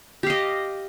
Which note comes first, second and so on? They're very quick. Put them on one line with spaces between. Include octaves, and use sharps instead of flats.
G4 F5 D#5